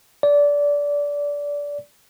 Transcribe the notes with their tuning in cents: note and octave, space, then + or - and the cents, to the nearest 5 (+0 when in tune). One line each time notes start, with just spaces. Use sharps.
D5 -20